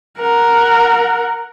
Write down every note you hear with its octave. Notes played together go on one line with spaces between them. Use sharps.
A#4 F#5